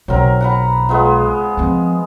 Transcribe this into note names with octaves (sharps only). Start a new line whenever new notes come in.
B1 F#3 C4 A#4
F#5 A#5 B5
G#3 B3 F4
F3 C4